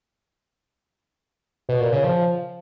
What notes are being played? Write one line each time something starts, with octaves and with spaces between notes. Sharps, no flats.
B2
A#2
C#3
F3